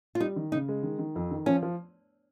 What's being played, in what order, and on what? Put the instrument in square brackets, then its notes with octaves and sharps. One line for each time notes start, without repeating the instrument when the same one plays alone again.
[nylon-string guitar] F4
[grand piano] G3 [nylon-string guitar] D#4
[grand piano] D#3
[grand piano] C#3 [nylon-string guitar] D#4
[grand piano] G#3
D#3
D#3
F2
D#3
[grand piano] F3 [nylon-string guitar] C#4
[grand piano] F3